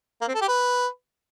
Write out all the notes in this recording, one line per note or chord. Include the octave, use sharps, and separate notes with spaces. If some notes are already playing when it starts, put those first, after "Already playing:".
A#3
C4
A4
G4
B4